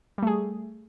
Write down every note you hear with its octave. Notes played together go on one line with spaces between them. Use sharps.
G3 A3 G#4